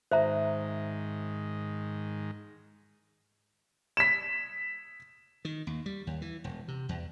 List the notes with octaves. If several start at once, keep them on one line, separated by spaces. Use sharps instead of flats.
G#2 D#3 C5 E5 A#5
B6 E7
D#3
D#2
G3
D#2
E3
E1
C3
E2